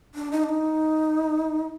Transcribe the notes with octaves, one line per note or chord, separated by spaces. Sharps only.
D4
D#4
D4
D#4